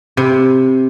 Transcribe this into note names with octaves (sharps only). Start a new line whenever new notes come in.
C3